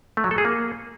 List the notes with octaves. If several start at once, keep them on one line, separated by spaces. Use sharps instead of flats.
A3
F#3
A4
G#4
A#3